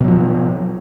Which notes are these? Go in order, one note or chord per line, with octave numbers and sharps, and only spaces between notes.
B2 F3 F#3